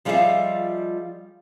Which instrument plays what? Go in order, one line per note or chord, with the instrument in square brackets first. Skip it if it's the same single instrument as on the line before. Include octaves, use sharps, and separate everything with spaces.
[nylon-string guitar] F3 G3 F4 G#4 D#5 E5